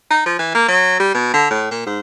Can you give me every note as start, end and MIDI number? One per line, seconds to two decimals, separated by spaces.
0.11 0.22 63
0.26 0.35 53
0.39 0.51 52
0.55 0.66 58
0.68 0.99 54
1.00 1.13 55
1.15 1.33 47
1.34 1.48 50
1.51 1.67 45
1.71 1.84 46
1.86 2.00 44